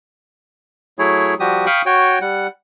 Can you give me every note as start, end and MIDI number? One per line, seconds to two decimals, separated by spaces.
0.99 1.34 54
0.99 1.34 57
0.99 1.34 64
0.99 1.34 68
0.99 1.34 73
1.40 1.66 53
1.40 1.66 55
1.40 1.66 66
1.40 1.66 67
1.40 1.66 87
1.66 1.82 77
1.66 1.82 79
1.66 1.82 83
1.66 1.82 85
1.66 1.82 87
1.86 2.19 66
1.86 2.19 73
1.86 2.19 79
2.21 2.47 55
2.21 2.47 78